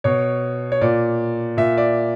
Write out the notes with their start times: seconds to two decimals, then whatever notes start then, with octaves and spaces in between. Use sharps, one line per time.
0.04 B2 C#5
0.72 C#5
0.81 A#2 D5
1.57 A#2 E5
1.77 D5